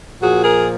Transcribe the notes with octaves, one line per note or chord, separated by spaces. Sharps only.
A#2 F3 F#4 G#4
G#4 A#4